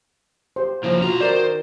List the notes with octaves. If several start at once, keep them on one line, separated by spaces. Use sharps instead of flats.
G4 C5
C#3 F3 A#3 E4
B1 C#4 F4 F#4 A#5
D#3 F#4 A#4 C5 D5